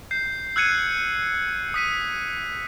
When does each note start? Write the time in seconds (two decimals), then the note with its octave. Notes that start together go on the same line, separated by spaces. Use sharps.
0.11 G6 C7
0.56 E6 F#6 G#6 C#7 D#7
1.74 D#6 B6 D#7